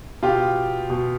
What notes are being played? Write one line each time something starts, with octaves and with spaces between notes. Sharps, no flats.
B2 F4 G4
B2